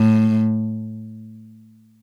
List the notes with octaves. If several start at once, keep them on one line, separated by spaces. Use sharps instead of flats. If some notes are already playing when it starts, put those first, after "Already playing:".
Already playing: A2